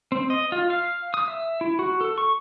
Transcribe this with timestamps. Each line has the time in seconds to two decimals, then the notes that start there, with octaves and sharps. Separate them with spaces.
0.12 C4
0.30 D#5
0.52 F4
0.70 F5
1.14 D#6
1.28 E5
1.61 E4
1.79 F#4
2.01 A4
2.18 C#6